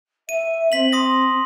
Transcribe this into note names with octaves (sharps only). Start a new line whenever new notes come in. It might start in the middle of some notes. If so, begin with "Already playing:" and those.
E5 D#7
C4 B6 F#7
C6 D#6 A#6